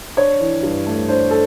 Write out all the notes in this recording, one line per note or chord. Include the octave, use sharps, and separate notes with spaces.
D4 C#5
E3
G2
A3
D4 C5
A4